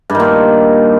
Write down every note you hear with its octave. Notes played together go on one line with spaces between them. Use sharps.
G2
D#3
A#2